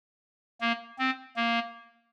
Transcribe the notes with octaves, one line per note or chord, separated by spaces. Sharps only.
A#3
C4
A#3